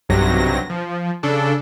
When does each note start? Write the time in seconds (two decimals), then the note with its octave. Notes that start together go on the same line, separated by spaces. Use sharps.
0.09 B1 G2 C3 F#3 A#6
0.70 F3
1.23 C#3 D4 A4